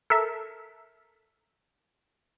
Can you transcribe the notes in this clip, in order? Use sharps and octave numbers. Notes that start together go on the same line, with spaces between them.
A4 A#4 E5